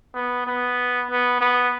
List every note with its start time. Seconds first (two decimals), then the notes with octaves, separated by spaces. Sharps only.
0.15 B3
0.47 B3
1.10 B3
1.41 B3